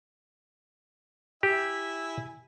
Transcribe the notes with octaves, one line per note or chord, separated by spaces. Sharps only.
E4 G4 E5 G#5